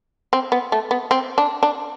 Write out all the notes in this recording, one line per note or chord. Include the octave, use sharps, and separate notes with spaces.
C4
B3
A3
B3
C4
D4
D4